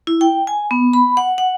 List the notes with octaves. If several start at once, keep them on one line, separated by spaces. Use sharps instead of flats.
E4
G5
G#5
B3
B5
F#5
F#5